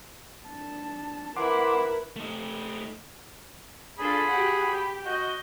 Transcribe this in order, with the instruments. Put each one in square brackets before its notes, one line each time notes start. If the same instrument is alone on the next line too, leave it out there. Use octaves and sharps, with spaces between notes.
[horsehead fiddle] D4 A5
[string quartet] E4 B5 [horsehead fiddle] A#4 B4 [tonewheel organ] F#5 C6 D6
[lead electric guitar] A3 D#4
[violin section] D4 F4 A4 [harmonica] G#4 B5
[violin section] F#4 G4 F#5
G4
[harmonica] F#4 [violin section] D#5 G6